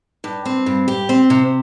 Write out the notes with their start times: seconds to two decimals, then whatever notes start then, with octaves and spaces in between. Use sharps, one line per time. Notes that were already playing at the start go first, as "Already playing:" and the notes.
0.24 G2
0.45 C4
0.66 G2
0.88 G4
1.09 C4
1.30 C3